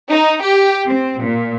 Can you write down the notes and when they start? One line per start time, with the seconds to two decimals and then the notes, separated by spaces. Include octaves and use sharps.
0.10 D#4
0.43 G4
0.88 C4
1.23 A#2